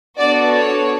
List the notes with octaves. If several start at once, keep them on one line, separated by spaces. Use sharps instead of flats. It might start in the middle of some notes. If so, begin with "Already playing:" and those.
B3 D4 F#4 A4 D5
C#5